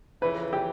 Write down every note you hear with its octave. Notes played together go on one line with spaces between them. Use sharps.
F2 C#3 E3 B4
G4